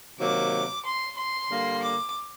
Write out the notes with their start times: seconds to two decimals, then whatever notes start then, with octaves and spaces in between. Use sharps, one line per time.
0.20 C3 D#3 F#3 A#3 D6
0.85 C6
1.17 C6
1.50 D3 G3 A#3
1.83 D6